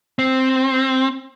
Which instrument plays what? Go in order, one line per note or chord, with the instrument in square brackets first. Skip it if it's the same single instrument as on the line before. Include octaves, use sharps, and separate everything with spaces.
[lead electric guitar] C4